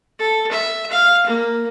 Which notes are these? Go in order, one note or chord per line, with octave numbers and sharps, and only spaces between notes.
A4
E5
F5
A#3